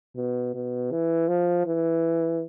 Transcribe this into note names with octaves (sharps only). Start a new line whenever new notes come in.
B2
B2
E3
F3
E3